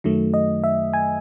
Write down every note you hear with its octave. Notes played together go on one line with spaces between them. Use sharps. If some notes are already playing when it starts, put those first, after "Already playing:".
F#2 D#3 F#3 A3
D#5
E5
G#5